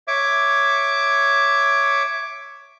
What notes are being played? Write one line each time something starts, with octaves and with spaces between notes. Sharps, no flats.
C#5 E5 D6